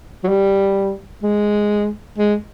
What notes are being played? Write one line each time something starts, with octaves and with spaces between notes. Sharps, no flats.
F#3
G3
G#3
G#3